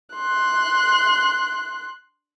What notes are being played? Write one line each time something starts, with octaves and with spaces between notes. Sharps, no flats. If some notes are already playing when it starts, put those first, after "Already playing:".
C6 F#6